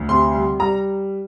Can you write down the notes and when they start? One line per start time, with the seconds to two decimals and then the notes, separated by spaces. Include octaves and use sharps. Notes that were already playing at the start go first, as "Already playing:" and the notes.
Already playing: D2
0.09 C3 C6
0.34 G3
0.59 G3 A#5